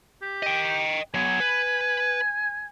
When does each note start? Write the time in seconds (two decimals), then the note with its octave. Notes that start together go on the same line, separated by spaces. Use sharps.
0.22 G4
0.43 D#5 G5
1.14 F#3 B3 G#5
1.40 B4